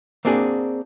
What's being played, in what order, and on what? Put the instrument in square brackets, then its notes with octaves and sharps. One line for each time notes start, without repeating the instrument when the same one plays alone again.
[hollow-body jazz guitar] A#3 C4 D4 F#4 G#4